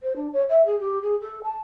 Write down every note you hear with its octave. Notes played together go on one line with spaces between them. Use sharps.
C5
D4
C#5
E5
G#4
G4
G#4
A4
A5